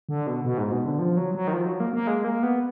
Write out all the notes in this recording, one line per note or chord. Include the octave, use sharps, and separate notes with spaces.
D3
B2
B2
G#2
B2
D3
F3
F#3
F#3
D#3
F3
F#3
A#3
A#3
G#3
A#3
B3